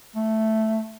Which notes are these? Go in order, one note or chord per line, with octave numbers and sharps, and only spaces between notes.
A3